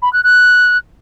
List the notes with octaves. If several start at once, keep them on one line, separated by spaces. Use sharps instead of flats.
B5
F#6
F#6